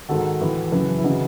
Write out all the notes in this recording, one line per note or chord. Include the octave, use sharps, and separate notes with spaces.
G#2 D#3 F#4 A4
A2 E3
F#2 C#3 E3
E4
C#3 E3 D#4 F#4